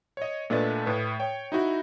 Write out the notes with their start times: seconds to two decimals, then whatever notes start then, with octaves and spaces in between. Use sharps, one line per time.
0.17 C#5 D#5
0.50 A#2 A3 D4 B4 D#5 A6
0.86 A2 B4
1.20 C#5 G5
1.52 D#4 E4 F#4